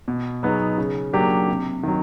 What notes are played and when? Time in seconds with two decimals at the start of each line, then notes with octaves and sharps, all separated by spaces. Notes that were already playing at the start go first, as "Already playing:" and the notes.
0.08 B2
0.43 F#3 B3 D#4 G#4
0.78 C#3
1.13 F#3 A#3 D4 G4
1.48 C3
1.83 D#3 F#3